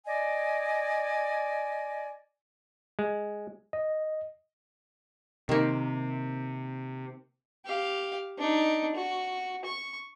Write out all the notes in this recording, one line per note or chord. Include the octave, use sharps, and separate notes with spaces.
D5 D#5 G#5
G#3
D#5
C3 D#3 A#3
G4 F5
D4 D#4
F#4
C#6